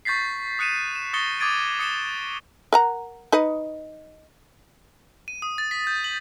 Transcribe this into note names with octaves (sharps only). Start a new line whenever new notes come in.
C#6 G6 A6 B6 C7
D#6 F#6 C#7 D#7 E7
E7
C#6 D#6 A6 A#6 C#7 G7
D6 D#6 G#6 A6 D7 D#7
D#6 C#7 E7 G7
A#4 F#5 A#5
D#4 B4 D#5
D#7
D#6
A6
B6
G6
F#7